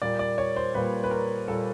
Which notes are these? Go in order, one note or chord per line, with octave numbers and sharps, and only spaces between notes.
A#2 G3 A#3 D5
D5
C#5
C5
A#2 G3 A#3 B4
B4
A#4
A#2 G3 A#3 A4